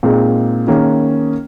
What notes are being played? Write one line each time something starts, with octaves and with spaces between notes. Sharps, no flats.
A#2 G#3 C4 D#4 G#4
D#3 A#3 C#4 G#4